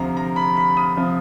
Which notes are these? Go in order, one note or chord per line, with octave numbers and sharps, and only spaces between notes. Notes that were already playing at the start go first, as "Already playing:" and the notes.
Already playing: D2 C3 F3 A#5
A#5
B5
B5
D#6
C3 F3